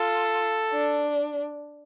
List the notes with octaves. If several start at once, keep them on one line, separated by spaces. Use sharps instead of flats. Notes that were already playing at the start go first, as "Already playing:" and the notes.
Already playing: F4 A4
D4